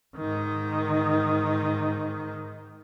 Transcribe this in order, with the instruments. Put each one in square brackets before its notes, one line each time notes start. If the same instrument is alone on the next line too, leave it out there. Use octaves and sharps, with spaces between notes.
[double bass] G#2 D#3